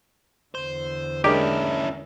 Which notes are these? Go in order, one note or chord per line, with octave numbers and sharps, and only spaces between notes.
E2 D3 C5
G#3 C#4 D4 E4 G4 A#4